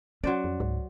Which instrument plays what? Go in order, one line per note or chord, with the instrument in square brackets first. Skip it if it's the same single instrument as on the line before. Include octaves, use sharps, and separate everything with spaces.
[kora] F#3 C5 D5 [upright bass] C#4
[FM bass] F2
[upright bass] C#2 [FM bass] G#2